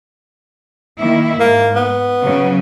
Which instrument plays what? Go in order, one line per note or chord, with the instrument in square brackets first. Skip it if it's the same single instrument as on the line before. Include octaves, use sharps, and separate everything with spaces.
[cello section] D#3 A#3 E4
[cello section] G#2 [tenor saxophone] A#3
[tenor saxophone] B3
[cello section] C#3 F#3 C#4